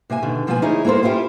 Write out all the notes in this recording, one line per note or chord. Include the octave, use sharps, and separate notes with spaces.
C3 A#3 E5 G#5
B2 D3 D#3
B2 F3 A#3 B3 F4 G#5
D2 D#4 E4 G#4 C#5
A#3 B3 A4 A#4 C5
B3 C#4 E4 F4 G4